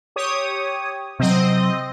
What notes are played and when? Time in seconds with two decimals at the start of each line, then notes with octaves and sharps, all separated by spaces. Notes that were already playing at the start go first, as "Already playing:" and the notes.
0.16 G4 C#5 D#6
1.19 C3 F#3 C4 D#5